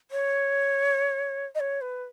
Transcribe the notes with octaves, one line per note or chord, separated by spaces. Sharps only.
C#5
D#5
C#5
B4